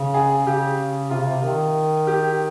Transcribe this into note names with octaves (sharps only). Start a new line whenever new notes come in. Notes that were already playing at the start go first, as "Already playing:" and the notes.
Already playing: C#3
G#4
C#3 G4
C3 F4
C3
D#3
G4